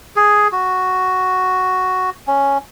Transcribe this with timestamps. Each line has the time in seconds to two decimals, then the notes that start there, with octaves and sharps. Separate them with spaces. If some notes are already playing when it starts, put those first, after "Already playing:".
0.16 G#4
0.52 F#4
2.27 C#4